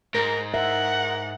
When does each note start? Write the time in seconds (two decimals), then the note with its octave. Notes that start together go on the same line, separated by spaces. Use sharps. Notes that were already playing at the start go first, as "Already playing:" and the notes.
0.14 G#2 A#4
0.54 A#4 E5 F#5